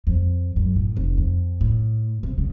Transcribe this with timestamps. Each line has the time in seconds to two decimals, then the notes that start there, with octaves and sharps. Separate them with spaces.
0.07 F2
0.56 F#2
0.76 A2
0.97 F1
1.17 F2
1.61 A2
2.23 C3
2.38 C#3